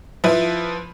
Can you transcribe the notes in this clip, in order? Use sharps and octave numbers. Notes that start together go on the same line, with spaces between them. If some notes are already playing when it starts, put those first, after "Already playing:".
F3 E4 B4